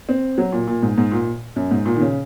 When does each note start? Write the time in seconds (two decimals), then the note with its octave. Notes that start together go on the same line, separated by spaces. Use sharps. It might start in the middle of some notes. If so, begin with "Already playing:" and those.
0.09 C4
0.38 F#3
0.52 A#2
0.67 A#2
0.83 G#2
0.98 G#2
1.12 A#2
1.56 F#2
1.71 G#2
1.86 A#2
1.96 D#3
2.01 C#3